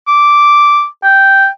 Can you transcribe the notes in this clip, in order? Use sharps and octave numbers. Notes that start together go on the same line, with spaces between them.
D6
G5